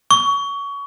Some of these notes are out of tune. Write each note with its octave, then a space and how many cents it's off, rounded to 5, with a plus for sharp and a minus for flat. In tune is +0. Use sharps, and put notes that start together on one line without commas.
C#6 +25